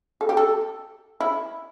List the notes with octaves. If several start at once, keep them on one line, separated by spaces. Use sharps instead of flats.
A4
G4
A4
E4